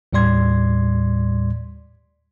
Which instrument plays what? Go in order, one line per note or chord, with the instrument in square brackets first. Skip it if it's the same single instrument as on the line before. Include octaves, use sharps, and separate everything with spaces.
[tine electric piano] D#2 A2 G3 D5 C6 G#6